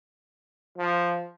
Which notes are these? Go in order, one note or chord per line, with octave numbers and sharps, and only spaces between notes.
F3